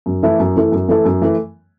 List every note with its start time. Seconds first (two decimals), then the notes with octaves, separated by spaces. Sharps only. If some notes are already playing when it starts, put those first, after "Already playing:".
0.06 F#2
0.23 E3 A3 E4 A4
0.39 F#2
0.56 E3 A3 E4 A4
0.72 F#2
0.89 E3 A3 E4 A4
1.05 F#2
1.22 E3 A3